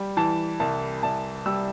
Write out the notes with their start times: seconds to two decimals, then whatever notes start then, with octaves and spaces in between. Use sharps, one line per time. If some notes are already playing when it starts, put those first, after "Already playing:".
Already playing: G3
0.17 E3 A5
0.60 C2 A5
1.03 C2 A5
1.46 G3 E6